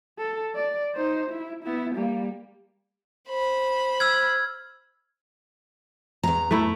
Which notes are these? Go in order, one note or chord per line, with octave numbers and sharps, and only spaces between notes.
A4
D5
D#4 C5
E4
B3 E4
G3 A#3
C5 B5
E6 F6 G#6
E2 A#5
A3 E4